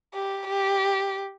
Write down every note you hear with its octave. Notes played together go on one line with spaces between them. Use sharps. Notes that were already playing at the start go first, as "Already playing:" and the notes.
G4
G4